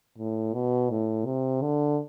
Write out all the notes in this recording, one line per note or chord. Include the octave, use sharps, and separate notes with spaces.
A2
B2
A2
C3
D3